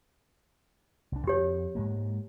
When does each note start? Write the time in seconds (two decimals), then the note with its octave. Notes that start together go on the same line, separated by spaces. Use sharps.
1.12 C2 D4
1.27 F2 G4 C#5
1.75 G#2 G#3 A#3